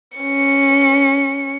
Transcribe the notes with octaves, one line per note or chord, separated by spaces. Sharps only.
C#4 C#7